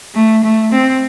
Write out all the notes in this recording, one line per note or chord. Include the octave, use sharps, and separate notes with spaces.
A3
A3
C4